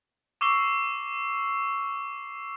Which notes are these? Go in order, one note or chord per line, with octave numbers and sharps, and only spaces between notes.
C#6 D6 E6 C7 G7